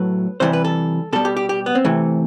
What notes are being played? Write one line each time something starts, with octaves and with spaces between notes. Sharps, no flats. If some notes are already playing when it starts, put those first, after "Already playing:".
Already playing: A2 F#3 A3 B4
C3 E3 G3 C5
B4
A4
B2 G3 A4
G4
G4
G4
B3
C4
C3 E3 A3